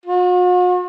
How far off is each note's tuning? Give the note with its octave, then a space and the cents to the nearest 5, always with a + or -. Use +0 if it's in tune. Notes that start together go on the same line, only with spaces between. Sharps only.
F#4 -45